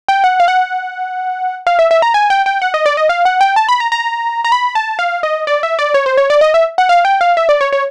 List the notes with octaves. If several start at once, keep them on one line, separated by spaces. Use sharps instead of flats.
G5
F#5
F5
F#5
F5
E5
E5
A#5
G#5
G5
G5
F#5
D#5
D5
D#5
F5
F#5
G5
A5
B5
A#5
A#5
A#5
B5
A5
F5
D#5
D5
E5
D5
C#5
C5
C#5
D5
D#5
E5
F#5
F5
G5
F5
E5
D5
C#5
C#5